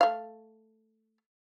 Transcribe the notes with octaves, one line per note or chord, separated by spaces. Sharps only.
A3 F5